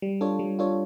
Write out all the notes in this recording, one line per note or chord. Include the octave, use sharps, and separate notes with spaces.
G3
D4 F4 A4 C#5
G3
D4 F4 A4 C#5